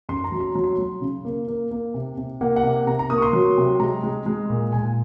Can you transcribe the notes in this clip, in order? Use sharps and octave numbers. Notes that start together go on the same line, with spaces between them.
F#2 C6
A#5
F#3
C6
F#3 A#5
C6
A#5
F#3
C#3
A#3
A#3
A#3
C3
C3
A#3 F#5
F#5
C3
C3 A#5
A#5
A#3 D#6
C#6
C6
F#3
C3
G#3 A#5
G#3
G#3
A#2
A#2 G#5